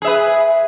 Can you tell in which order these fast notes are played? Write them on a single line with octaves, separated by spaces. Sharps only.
G#4 E5 B4